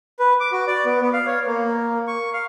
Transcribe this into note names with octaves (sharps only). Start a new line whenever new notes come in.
B4
D6
F#4
D5
B3
B3
F5
C#5
A#3
C#6
F5